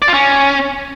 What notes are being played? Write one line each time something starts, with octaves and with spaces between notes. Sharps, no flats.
D5
F4
C#4